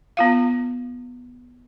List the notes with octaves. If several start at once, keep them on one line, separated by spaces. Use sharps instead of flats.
B3 F4 F5